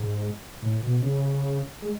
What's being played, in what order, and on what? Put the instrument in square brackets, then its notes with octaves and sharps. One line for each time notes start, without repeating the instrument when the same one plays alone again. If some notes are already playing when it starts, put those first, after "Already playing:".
Already playing: [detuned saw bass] G#2
A2
B2
C#3
G#3